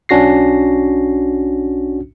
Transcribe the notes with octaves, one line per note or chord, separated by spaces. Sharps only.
B1 C#4 D4 F#4 A#6 C7